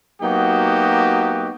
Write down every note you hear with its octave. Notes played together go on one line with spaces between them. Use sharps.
F#3 A#3 B3 D#4 F#4 G4